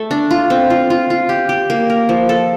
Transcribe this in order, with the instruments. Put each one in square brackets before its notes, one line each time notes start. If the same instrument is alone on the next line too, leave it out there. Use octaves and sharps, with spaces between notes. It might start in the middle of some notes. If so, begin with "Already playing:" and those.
Already playing: [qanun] A3 A4
D4
F4
C4
F4
F4
F4
G4
G4
A#3
A#4
F3
A4